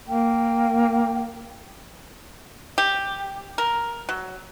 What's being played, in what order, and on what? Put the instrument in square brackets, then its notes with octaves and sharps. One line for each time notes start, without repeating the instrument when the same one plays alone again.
[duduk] A#3 [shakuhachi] G5
[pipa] G4
A#4
F#3